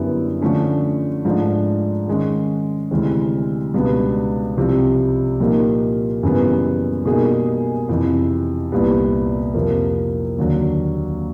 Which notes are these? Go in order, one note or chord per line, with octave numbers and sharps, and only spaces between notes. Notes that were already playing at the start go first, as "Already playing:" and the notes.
Already playing: F#2 D3 G3 B3 E4
D3 F3 A3 C#4
G#2 F3 A3 D4
D#3 G#3 C#4
D2 C3 E3 G#3 C4
C#2 B2 G3 B3 D4
C2 C3 F3
A#2 F3 A#3 D#4 G4
F#2 C#3 E3 G3 B3
B2 G3 A#3 D#4 G#4
F2 C3 E3
C2 A#2 G3 B3
F2 C3 F3 A#3
D#2 D3 F#3